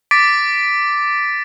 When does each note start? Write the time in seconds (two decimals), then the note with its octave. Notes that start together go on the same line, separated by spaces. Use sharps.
0.11 D6 A6 B6 D7